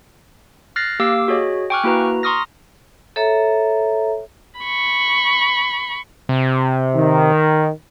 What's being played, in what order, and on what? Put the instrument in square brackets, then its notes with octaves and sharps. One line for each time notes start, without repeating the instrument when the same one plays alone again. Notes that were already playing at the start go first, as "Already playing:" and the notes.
[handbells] F6 F#6 A6 A#6 C7
A#3 G4 F5 D6 E6
F#4 G#4 C#5 D#5
G5 G#5 C#6 D6 F6 F#6
A#3 E4 F#4 B4 A#5
A#5 C6 C#6 D#6 F6 A#6
[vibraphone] A4 C#5 E5 A#5
[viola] B5 C#6
[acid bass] C3
[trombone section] D#3